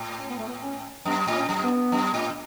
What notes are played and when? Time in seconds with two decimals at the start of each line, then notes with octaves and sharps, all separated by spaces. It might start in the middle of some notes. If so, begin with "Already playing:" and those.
Already playing: A2
0.19 C#4
0.28 B3
0.38 A3
0.48 B3
0.63 C#4
1.05 F#2 B3
1.27 A2
1.34 C#4
1.49 F#2
1.63 B3
1.92 F#2
2.14 A2